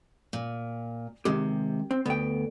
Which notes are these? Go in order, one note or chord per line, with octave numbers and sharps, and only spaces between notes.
A#2
C3 D#3 G#3 G4
C4
D2 B3 G5